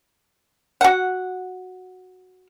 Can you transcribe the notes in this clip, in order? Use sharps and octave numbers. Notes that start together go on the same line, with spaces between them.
F#4 F#5